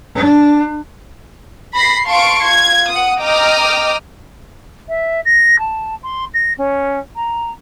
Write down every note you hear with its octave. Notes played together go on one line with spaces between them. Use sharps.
D4
B5 A#6 C7
F5 A5 C6 C#6 D7
F4 G#6
F#5 D#6
D#5 G5 A#5 D6 D#6 F6
E5
A#6
A5
C6
A#6
C#4
A#5